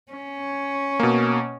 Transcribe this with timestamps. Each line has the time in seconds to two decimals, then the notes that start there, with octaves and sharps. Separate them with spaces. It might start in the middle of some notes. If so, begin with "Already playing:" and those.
0.12 C#4
1.00 B2 A#3